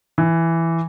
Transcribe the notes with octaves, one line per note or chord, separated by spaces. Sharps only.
E3